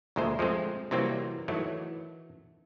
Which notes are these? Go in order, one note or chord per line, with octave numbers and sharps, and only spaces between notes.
D2 A#2 G#3 A3 C5
F3 G#3 A3 C4
C3 E3 F#3 G3 A#3 C4
D#3 E3 F#3 A3